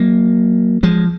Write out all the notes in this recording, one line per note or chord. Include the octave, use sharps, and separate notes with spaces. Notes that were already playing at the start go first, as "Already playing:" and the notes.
Already playing: F#3 A#3
F3 G#3